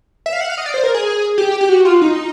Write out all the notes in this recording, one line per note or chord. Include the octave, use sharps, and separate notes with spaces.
E5
F5
F#5
F5
D#5
D5
C5
A#4
G#4
G4
G4
F#4
F4
D#4